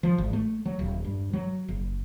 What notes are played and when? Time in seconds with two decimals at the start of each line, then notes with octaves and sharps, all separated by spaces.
0.03 F3
0.18 G#1
0.33 A3
0.66 F#3
0.79 D#1
1.05 G2
1.33 F#3
1.69 F#1